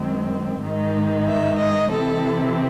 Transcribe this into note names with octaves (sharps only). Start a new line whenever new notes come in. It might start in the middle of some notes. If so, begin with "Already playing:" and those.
Already playing: F#2 D#3 G#3 C4
G#2 D#3 G#3 D#4
E5
D#5
C3 E3 C4 E4 A4